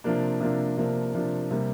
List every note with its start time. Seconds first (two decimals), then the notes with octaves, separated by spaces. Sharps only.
0.04 C3 F3 A#3 D4
0.40 C3 F3 A#3 D4
0.77 C3 F3 A#3 D4
1.14 C3 F3 A#3 D4
1.51 C3 G3 A#3